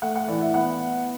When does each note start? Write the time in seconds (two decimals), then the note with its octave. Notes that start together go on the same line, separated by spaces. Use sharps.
0.02 A3 F#5
0.16 F#5
0.28 E3 D5
0.41 E5
0.54 B3 F#5